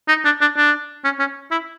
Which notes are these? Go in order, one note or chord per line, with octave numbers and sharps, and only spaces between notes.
D#4
D4
D4
D4
C#4
C#4
E4